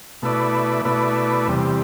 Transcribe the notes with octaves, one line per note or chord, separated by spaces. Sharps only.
B2 A3 E4 B4 D5
B2 A3 E4 B4 D5
E2 C3 G3